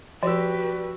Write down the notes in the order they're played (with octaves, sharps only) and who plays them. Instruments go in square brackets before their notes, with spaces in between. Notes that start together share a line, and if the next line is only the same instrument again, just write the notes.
[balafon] F3 [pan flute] F#4 [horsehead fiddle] G4 B4 [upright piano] D5 E6